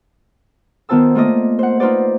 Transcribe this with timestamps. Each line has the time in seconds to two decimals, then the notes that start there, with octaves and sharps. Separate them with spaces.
0.89 D#3 B3 F4 C5 A5 E6
1.15 A3 A#3 F4 D5 D#5
1.59 C5 F#5
1.80 D#4 F4 B4 C5 D5